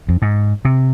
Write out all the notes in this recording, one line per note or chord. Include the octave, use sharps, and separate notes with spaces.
F2
G#2
C3